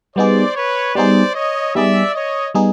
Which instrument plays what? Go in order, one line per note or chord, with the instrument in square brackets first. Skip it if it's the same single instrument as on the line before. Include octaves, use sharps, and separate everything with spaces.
[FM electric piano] G3 B3 D#4 G#4 [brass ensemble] C5 D5
[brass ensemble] B4 C#5
[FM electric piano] G3 B3 D#4 G#4 [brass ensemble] C5 D5
[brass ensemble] C#5 D#5
[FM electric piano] G3 B3 D#4 G#4 [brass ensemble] D5 E5
[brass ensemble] C#5 D#5
[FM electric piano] G3 B3 D#4 G#4